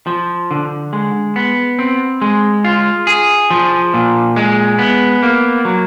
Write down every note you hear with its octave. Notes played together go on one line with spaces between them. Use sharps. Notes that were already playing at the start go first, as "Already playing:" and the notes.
F3
D3
G#3
B3
C4
G#3
F4
G#4
F3
A#2
G#3
B3
A#3
F#3